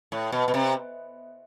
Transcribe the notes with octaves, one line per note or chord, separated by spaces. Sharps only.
A2
B2
B2
C3